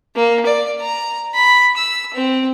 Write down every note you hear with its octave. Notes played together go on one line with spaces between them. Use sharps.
A#3
D5
A#5
B5
E6
C4